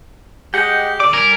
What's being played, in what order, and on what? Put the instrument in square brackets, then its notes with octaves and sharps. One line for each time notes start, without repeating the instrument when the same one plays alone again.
[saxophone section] G#3 G4 [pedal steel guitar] D#5 F#5 G5
[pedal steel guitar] D3 D6 [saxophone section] D5
[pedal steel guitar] G3 G#5 [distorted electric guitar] A#4